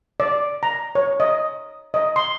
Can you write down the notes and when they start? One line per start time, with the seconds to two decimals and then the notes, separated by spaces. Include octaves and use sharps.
0.20 D5
0.63 A#5
0.95 C#5
1.20 D#5
1.94 D#5
2.16 C6